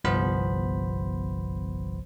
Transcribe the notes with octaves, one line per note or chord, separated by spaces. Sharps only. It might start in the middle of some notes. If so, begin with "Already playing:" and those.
G1 C2 F3 B3 C5 B5